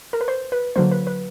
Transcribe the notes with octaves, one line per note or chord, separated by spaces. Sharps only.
A#4
B4
C5
B4
D3 F#3 A#3 C5
B4
B4